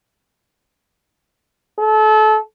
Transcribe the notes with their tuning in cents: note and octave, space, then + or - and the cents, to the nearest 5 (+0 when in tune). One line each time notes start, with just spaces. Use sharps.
A4 -30